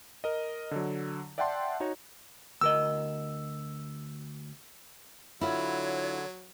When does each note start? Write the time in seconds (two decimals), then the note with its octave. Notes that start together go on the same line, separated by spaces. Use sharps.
0.24 A#4 D#5
0.71 D3 F#3
1.38 D5 E5 F#5 G5 A5 C6
1.80 D#4 F#4 C#5
2.61 D2 A#4 D#5 E6
5.41 D3 F#3 E4 F4 C#5